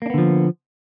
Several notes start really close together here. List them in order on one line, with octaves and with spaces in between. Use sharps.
A#3 D4 B3 D3 F3